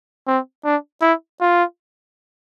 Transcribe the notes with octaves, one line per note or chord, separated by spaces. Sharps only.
C4
D4
E4
F4